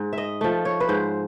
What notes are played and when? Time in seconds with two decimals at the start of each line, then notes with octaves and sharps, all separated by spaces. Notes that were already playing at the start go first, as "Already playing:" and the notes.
Already playing: G#2
0.13 E5
0.18 D#5
0.41 F3 A3
0.65 C#5
0.80 B4
0.89 G#2 C5